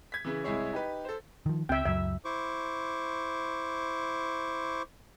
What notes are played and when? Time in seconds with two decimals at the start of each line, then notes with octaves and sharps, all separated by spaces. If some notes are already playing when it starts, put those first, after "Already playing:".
0.12 G#6 B6
0.25 C#3 E3
0.44 C2 G#3 E4 G#4 C#5
0.73 D#4 G4 B4
1.05 A4 C5
1.46 D#3 F3
1.69 C#2 C4 E5 G5
1.85 C#2 F#2 F#3 E5
2.25 E4 C5 C#6 D6